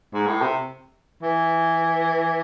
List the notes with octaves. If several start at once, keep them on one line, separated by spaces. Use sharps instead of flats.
G#2
A2
C3
E3